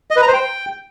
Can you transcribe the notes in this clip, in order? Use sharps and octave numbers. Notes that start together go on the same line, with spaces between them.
D#5
B4
A#5
C5
G5